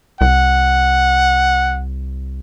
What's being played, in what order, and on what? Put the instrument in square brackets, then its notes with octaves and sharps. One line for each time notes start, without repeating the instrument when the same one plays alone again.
[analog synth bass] C2 [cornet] F#5